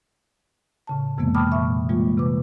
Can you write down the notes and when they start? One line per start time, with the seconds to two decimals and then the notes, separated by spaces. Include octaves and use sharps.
0.87 A2 C#3 A5
1.18 F2 C3 E3 G#3 A#3 B3
1.35 G5 A5 B5 D6 D#6 F6
1.52 A#2 E5 C#6
1.89 E3 G3 G#3 A#3 F4
2.18 C3 B4 D6